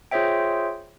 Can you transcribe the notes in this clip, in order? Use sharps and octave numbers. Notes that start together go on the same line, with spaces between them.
F4 G#4 C5 C#5 E5 G5